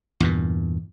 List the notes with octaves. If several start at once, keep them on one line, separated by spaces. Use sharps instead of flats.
E2 G2 A#2